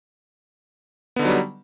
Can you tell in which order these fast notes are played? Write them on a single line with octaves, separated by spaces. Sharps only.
B3 D3 D#4 F#3 G3